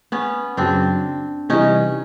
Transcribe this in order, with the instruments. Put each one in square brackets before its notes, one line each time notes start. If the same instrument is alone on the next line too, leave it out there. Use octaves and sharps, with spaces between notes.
[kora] B3 C#4
[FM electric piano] F#2 C#3 F#3 [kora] C4 D4
[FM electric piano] C3 E3 G3 [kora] C#4 D#4